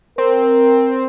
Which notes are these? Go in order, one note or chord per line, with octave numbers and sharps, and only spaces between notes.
C4 A#4